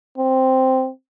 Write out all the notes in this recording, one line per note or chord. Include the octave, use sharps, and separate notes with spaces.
C4